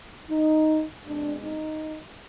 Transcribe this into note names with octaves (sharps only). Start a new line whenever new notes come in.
D#4
B2 G#3 C4 D4
D#4